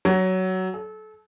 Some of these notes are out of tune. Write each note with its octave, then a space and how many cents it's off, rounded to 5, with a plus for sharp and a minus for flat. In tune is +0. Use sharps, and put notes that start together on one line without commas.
F#3 +15
A4 -30